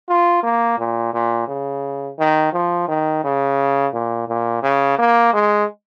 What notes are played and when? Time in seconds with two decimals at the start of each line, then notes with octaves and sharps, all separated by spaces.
0.08 F4
0.43 A#3
0.78 A#2
1.14 A#2
1.48 C#3
2.19 D#3
2.53 F3
2.88 D#3
3.24 C#3
3.93 A#2
4.28 A#2
4.63 C#3
4.98 A#3
5.33 G#3